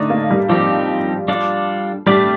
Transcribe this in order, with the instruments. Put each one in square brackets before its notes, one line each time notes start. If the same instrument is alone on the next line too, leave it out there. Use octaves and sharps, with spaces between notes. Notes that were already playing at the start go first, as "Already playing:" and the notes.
Already playing: [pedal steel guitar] D3 A3 D#4 [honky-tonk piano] D4
[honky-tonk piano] A#3
G3
[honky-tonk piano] F3 [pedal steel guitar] G3 C4 D#4 G4
[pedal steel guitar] G3 D4 F4 A4 D5
[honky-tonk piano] G3 [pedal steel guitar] A3 D4 G4 D5